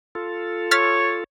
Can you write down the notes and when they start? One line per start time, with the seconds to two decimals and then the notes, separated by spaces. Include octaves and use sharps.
0.15 F4 A4
0.71 C#5 F6 A6 B6